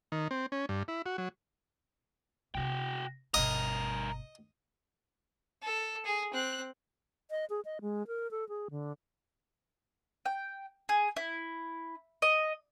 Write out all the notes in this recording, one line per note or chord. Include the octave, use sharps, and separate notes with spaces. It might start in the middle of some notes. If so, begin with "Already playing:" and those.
D#3
C4
C#4
G2
E4
F#4
F#3
C3 C4 F#4 G5
G1 G2 B2 A#4 D#5
A4
G#4
C4 F#6
D#5
G#4
D#5
G#3
A#4
A4
G#4
D3
G5
G#4
E4
D#5